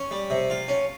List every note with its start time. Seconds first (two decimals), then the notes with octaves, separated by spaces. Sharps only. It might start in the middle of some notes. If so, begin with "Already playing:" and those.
Already playing: C#4
0.11 G3
0.30 C3
0.50 F4
0.68 C#4